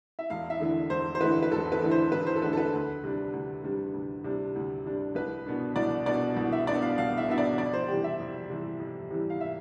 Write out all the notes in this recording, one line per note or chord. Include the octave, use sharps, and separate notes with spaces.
E5
E1 F5
E5
E2 D3 A3 E4
E1 C5
C5
E2 D3 A3 E4 B4
B4
E1 A4
B4
E2 D3 A3 E4
C5
E1 B4
C5
A4
E2 D3 A3 E4 B4
A4
B4
D2
C3 G3 D4
D2
C3 G3 D4
D2
C3 G3 D4
D2
C3 G3 D4
C2 B4
B2 B3 D4
C2 D5
B2 B3 D4 D5
C2
E5
B2 B3 D4 D5
F5
C2 F5
E5
B2 B3 D4 E5
D5
F2 D5
C5
C3 E3 G3 G4
E5
F2
C3 E3 G3
F2
C3 E3 G3
F5
E5